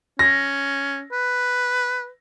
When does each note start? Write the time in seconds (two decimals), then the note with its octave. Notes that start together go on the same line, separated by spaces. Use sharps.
0.19 C#4 A#6
1.12 B4